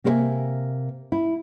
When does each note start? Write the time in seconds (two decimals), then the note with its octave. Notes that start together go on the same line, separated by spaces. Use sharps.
0.04 C3 A#3 A4 C5 E5 G#5
1.12 E4